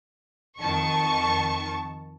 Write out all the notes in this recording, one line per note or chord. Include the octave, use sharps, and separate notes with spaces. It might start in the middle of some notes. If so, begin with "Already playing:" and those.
F2 D#3 A5 C#6